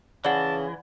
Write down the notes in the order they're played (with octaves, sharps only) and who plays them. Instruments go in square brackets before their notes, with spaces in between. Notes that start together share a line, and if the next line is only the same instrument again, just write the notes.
[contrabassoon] C#3 [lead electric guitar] E3 [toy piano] D5 F#5 [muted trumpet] A5